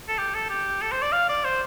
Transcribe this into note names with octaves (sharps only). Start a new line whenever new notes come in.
A4
G4
A4
G4
A4
C5
D5
F5
D5
C5